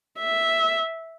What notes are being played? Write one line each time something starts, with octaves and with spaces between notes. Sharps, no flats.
E5